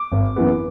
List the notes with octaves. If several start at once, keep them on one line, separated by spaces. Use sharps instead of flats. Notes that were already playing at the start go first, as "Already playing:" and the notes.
Already playing: D6
G#1
F#2 E3 B3